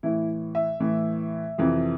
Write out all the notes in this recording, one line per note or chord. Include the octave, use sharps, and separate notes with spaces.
A2 E3 E4
E5
A2 E3
F2 C3 E3